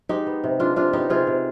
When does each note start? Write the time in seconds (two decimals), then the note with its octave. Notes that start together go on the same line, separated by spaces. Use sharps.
0.09 G#3 D#4 G4
0.27 B3
0.44 C3
0.60 G#3 D4 F4
0.76 C3 D4 F4
0.93 B3 D#4 G4
1.10 C3 F4 G#4
1.27 C3